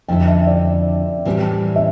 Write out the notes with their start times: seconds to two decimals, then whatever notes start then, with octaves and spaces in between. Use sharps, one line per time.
0.08 F2 D3 A3 E4 A4 G5
0.27 E5
0.47 D5
1.25 A2 E3 G3 C4 G4
1.76 E5